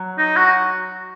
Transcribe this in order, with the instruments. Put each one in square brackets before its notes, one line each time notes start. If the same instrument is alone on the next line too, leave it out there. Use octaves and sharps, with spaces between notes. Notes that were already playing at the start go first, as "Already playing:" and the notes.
Already playing: [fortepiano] F#3
[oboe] D#4
F#4